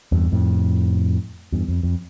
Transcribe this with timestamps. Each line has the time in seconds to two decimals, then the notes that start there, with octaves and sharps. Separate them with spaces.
0.12 E2 G2
0.32 F2 A2
1.52 E2 G2
1.68 F2
1.83 F2